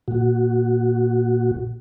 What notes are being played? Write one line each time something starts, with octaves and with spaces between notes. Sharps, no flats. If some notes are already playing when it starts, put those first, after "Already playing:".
A#2 F#4